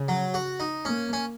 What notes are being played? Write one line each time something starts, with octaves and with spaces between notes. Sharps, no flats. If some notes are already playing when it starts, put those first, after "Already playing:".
Already playing: C#3
F#3
F#4
D#4
A#3 C#4
C#4